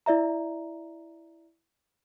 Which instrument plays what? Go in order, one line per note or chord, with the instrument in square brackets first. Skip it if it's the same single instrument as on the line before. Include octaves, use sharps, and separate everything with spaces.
[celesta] E4 D5 E5 A#5